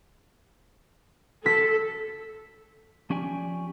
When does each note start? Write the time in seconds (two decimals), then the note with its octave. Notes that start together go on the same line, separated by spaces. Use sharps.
1.46 A4 B6
3.10 F3 C#4 G4 D5 G#5